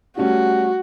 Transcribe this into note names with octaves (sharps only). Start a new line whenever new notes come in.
G3 A3 C#4 F#4